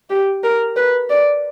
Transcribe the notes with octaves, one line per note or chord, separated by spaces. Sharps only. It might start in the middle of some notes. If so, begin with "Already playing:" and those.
G4
A#4
B4
D5